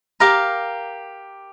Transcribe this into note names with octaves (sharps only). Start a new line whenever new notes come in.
G4 A#4 F5 D6